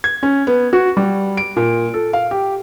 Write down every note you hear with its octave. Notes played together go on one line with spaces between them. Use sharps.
G#6
C#4
B3
F#4
G3
D7
A#2
A4
F5
G4